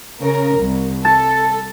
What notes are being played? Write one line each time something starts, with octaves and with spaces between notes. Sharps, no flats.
C#3 A#4
C2
A4 A5